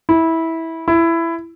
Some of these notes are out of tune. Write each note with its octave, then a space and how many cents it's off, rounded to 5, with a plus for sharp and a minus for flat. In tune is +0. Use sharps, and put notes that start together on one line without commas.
E4 -15
E4 +15